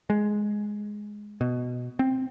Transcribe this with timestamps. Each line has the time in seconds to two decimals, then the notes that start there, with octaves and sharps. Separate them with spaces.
0.10 G#3
1.41 B2
1.99 C4